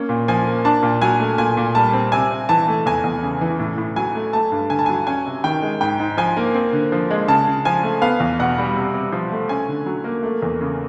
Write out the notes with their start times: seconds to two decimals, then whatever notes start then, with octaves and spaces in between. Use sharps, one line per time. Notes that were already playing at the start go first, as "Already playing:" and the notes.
Already playing: A#3 C#4
0.09 A#2
0.28 F3 G#5
0.46 A#3
0.65 D4 A5
0.83 A#2
1.02 F#3 G#5
1.20 A3
1.38 A#2 G#5
1.57 A#2
1.75 G3 A5
1.93 C4
2.12 C3 G#5
2.31 C3
2.49 E3 A5
2.68 A3
2.86 E2 G#5
3.04 E2
3.23 C#3
3.41 E3
3.59 A2
3.78 A2
3.96 F#3 G#5
4.15 A3
4.33 A3 A5
4.52 G2
4.70 D3 G#5
4.79 A5
4.86 F#3 G#5
5.07 C#4 G#5
5.26 C3
5.44 D#3 G5
5.62 G#3
5.81 G#2 G5
6.00 G#2
6.17 F3 G#5
6.37 A#3
6.54 C4
6.73 D3
6.92 F3
7.11 G#3
7.28 C#3 A5
7.47 C#3
7.65 F3 G#5
7.83 A3
8.02 B3 F5
8.20 E2
8.39 B2 F#5
8.58 G3
8.77 C3
8.94 C3
9.12 F3
9.32 A3
9.49 C#4 G#5
9.69 D3
9.86 F#3
10.04 A#3
10.23 A3
10.42 E2
10.61 C#3